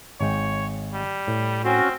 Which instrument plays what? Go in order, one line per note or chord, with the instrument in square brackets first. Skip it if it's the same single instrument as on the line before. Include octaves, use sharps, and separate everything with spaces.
[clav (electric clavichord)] G#1 G#3 G5 [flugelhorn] C#5
[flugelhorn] G3
[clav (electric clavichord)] A2
[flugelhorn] C4 [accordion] C#4 F#4